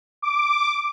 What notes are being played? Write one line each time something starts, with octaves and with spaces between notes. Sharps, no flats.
D6